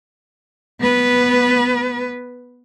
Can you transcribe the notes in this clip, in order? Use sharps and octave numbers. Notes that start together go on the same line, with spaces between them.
B3 B4